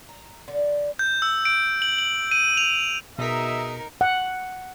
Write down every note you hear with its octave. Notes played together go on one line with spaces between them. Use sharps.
A#5
D3
G6
E6
D7
F#7
F#7
D#7
F7
B2 D#4 G#4 A#4 D#5 E5 B6
F#5